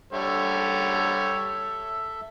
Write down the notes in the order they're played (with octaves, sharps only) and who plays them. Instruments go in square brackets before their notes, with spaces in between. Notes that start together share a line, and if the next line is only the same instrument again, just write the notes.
[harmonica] D3 G3 C#5 [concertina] A4 E5